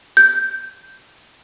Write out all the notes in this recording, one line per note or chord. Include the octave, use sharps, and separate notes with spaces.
G6